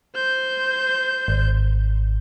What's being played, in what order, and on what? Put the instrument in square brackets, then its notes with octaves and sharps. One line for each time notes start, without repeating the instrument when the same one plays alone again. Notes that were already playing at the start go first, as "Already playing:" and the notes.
[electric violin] C5 G6
[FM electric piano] G#1